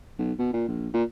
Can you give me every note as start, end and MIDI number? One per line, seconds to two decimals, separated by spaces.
0.19 0.33 35
0.39 0.52 47
0.53 0.65 46
0.68 0.88 34
0.94 1.03 46